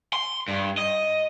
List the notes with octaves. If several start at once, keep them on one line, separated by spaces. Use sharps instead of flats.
C6
G2
D#5